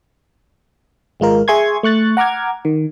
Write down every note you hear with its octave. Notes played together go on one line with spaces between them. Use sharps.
G#1 G#3 F4 A#4
G#4 E5 G#5 C6 C#6 G#6
A3 C#6 F#6 A6
F#5 A#5 D6 F6 G#6
D#3